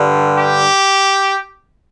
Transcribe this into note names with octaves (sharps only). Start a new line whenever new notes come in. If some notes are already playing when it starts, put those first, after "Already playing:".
Already playing: G2 D3 G3
G4